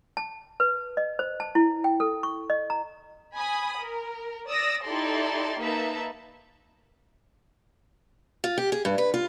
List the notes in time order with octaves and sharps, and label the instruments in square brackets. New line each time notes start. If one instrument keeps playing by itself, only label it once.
[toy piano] A5
B4
D#5
C5
A5
E4
G5
A4
C#6
D#5
A#5
[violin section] G#5 B5 D#6
A#4
D5 D#6 E6 A#6
D#4 E4 G4 A4 D5 C6
A#3 D#4 B4 E5 A5
[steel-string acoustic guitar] F4
G4
G#4
G2
B4
F4